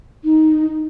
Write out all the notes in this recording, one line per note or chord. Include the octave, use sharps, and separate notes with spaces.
D#4